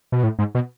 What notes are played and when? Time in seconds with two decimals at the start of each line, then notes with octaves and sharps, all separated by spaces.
0.12 B2
0.23 A2
0.39 G#2
0.55 B2